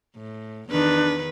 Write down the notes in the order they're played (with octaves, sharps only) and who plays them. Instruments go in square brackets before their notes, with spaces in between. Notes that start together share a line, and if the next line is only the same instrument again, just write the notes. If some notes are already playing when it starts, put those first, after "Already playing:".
[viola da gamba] A2
[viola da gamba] E2 D#3 B4 [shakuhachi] D4